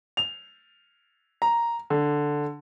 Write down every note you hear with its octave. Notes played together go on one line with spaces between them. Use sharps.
F7
A#5
D3